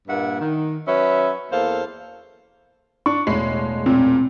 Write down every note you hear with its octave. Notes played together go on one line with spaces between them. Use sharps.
G2 A#2 A#3 E5 F#5
D#3
F#3 C#4 B4 E5
E2 A#3 A4 C5 F5
D4 C#6
E1 A2 G#3 C7
A#2 C4